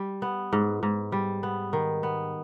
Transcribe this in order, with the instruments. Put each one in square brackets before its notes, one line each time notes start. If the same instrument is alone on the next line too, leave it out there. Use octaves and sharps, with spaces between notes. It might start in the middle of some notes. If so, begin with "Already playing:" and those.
Already playing: [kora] G3
B3
G#2
G#2
G3
B3
D#3
B3